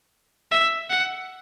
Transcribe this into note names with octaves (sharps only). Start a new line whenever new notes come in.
E5
F#5